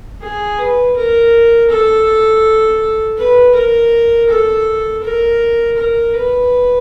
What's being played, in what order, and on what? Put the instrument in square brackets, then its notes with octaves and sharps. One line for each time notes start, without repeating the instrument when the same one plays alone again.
[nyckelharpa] G#4
B4
A#4
A4
B4
A#4
A4
A#4
A#4
B4